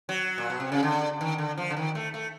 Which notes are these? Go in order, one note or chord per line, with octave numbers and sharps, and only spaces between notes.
F#3
A#2
B2
C3
C#3
D3
D#3
D3
F3
D3
D#3
A3
A3